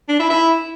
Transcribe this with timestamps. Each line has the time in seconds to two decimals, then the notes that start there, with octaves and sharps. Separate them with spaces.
0.09 D4
0.19 E4
0.30 E4